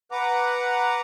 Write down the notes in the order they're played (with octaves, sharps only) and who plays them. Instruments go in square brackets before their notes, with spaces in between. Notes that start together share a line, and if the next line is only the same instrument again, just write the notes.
[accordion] B4 F#5 A#5 D6